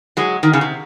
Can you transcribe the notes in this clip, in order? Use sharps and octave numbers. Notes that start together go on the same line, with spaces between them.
F#3 G#3
D#3
C#3
C3